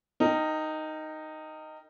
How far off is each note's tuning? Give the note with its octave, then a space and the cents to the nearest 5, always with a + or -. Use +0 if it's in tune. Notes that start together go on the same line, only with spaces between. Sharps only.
D#4 +0 A#4 -25 G5 +0